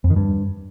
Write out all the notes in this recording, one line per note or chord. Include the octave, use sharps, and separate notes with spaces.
F2
D#3
G2